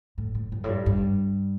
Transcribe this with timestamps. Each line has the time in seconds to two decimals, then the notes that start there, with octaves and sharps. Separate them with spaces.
0.18 A2
0.35 A2
0.52 G2
0.64 A2
0.68 G2
0.86 G2